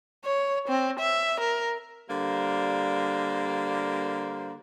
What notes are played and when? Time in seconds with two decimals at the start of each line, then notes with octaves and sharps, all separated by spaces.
0.25 C#5
0.68 C4
0.99 E5
1.40 A#4
2.09 D3 G3 A#3 A#4 C5